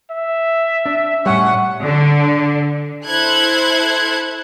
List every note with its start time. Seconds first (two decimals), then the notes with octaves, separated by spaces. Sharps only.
0.11 E5
0.86 D4
1.26 A2 G3 C#4 F#5
1.84 D3
3.07 E4 A4 C5 F#6 G#6